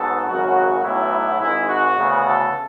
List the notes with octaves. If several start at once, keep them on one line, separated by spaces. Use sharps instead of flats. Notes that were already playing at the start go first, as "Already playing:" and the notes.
Already playing: G#2 F#3 B3 A4
G#1 F#2 C#3 F#3 F#4
B1 A2 F#3 B3 E4
G#1 G#2 G#3 E4
F#4
D2 C#3 E3 B3
A4